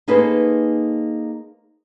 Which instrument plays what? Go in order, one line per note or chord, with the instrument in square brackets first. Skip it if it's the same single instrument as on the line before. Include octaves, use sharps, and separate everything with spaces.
[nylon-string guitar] A#3 D#4 G#4 A4 B4 C5